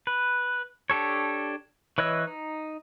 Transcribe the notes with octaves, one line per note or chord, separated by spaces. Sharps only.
B4
D4 G4 A4 C#5
E3 B4 C#5 D#5 E6
D#4